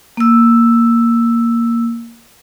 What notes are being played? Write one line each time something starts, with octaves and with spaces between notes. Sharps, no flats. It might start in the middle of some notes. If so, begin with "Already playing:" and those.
A#3 E6